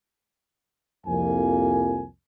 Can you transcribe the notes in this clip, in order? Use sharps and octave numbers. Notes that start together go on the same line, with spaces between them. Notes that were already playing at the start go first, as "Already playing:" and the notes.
C2 F2 A#3 G#5